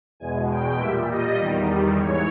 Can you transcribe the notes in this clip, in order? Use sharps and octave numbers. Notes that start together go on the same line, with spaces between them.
E2 B2 G#3 G#5
G5
A#2 G3 E5
D#5
E2 D#3 G3
G#2 E3 C#5